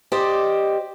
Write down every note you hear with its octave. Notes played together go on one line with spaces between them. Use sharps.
G4 C5 D5 D#5